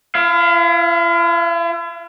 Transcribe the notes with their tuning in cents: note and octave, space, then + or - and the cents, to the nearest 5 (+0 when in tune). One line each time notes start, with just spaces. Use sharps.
E4 +45 F5 +0